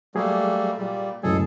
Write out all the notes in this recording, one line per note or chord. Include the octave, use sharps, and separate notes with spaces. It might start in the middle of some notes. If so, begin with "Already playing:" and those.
F#3 G3 A3 A#3 G#4
A#2 G3
C#2 F#2 A2 F#3 G#4 A4 D#5 G#5